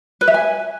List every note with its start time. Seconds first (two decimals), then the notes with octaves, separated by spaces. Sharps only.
0.21 B4
0.28 E5
0.34 G#5